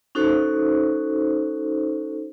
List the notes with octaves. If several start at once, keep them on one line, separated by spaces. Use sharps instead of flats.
C#4 D#4 F#4 A4 C5